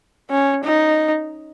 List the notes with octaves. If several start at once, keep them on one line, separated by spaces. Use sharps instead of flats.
C#4
D#4